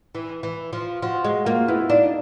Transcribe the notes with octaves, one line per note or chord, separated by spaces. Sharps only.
E3
E3
F3
F3 F#4
G#3 F#4
A#3 F4
B3 E4
E4
D4 D#4